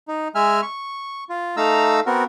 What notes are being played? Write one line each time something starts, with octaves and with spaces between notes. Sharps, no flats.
D#4
G#3 E5 G#5 F6
C#6
F4
A3 D#4 F5 A#5 E6
B3 C4 F#4 A#4